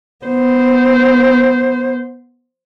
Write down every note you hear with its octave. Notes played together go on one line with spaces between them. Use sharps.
B3 C5